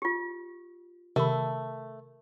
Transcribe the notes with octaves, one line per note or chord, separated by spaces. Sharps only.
F4 G4
C3 D#3 A3 A#4 B5